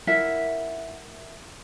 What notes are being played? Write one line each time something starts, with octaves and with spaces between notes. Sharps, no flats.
E4 A#4 E5 F#5